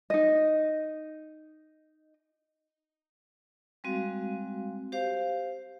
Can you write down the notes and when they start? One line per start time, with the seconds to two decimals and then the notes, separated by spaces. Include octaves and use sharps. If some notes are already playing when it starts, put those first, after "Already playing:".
0.10 D#4 D#5
3.84 G3 G#3 C4 F#4 F5
4.92 G4 C5 F5